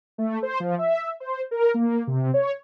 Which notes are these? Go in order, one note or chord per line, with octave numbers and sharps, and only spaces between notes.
A3
C5
F3
E5
C5
A#4
A#3
C3
C#5